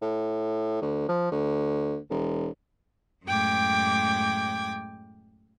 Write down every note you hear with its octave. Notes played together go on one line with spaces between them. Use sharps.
A2
D2
F3
D2
E1
F#2 A2 G#3 G5 D6 G#6